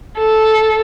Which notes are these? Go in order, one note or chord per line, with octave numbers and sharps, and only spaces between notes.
A4